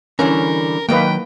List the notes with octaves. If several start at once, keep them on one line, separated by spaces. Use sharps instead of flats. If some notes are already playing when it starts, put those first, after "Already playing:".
D3 E3 G3 C#4 A#4
D#3 F#3 A#3 B4 D#5 G5